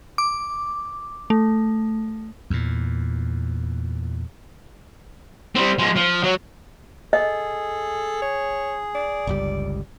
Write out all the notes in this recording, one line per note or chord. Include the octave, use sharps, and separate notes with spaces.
D6
A3
E2 A#2
G3 C4
F3 G#3
F3
F#3
G#4 A4 D#5
C#5
D5
G1 C#2 G3